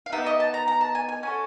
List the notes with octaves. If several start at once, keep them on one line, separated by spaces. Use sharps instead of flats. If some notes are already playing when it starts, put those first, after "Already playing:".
F5
B3 D#4 G4 E5
D#5
A5
A#5
A#5
A5
G#5
G#5
C#4 F#4 A4 G#5